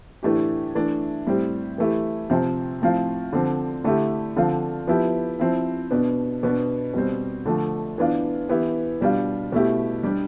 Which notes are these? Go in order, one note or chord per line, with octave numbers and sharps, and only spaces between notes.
A2 E3 A3 D4 G4
E3 A3 D4
A2 G3 C4 G4
E3 A3 E4 G4
C3 F3 C4
A2 F3 C4 F4
D3 F3 C4
D3 A3 E4 G4
D3 F3 C4 F4
F3 B3 E4 G4
F3 C4 E4
B2 B3 D4
B2 B3 D4
B2 G3 C4
D3 F3 A3
E3 B3 D4 F4
E3 B3 E4 G4
B2 G3 D4 F4
B2 A3 E4 G4
G3 D4 G4